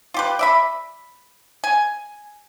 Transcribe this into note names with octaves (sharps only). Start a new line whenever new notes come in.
F4 G4 B4
D5 E5 B5
G#5